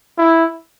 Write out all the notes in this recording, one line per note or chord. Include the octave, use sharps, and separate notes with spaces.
E4